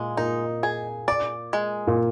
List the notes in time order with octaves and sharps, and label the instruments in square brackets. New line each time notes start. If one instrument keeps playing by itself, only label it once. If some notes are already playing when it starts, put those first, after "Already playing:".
Already playing: [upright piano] A#2 [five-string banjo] G#3
[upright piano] A#2 [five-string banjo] D#4
[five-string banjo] G#4
D5
G#3
[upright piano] A#2